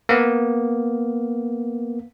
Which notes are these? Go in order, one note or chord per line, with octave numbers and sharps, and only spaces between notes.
A#3 B3